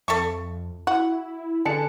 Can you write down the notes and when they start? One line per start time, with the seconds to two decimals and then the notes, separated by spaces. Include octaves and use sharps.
0.08 F2 A4 E5 C#6
0.87 E4 F#4
1.65 D3 G#4 A5 C#7